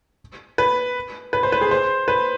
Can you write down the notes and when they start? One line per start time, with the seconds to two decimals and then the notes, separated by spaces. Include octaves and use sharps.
0.58 B4
1.33 B4
1.43 C5
1.52 B4
1.61 G#4
1.71 C5
2.08 B4